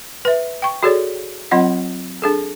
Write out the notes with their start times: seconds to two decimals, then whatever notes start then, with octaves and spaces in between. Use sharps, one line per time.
0.25 B4 E5
0.62 G5 C#6
0.83 F#4 G#4 A4 C#5 D5
1.51 F#3 C4 F4 D#5 F#5
2.22 D4 G#4 A4